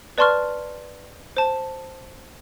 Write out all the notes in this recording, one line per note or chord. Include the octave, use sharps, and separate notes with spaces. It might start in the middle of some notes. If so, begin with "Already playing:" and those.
B4 D5 A5 C6 C#6 F6
C5 A5